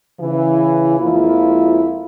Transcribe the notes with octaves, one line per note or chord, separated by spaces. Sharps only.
C#3 E3
F2 F3 G#3 A#3 E4 F4